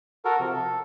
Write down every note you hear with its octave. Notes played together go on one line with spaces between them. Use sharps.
F#4 A4 A#4
C3 F3
A4